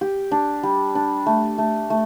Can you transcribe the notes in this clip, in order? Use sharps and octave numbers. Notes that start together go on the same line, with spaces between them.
G4
D4
G3
D4
A3
A3
A3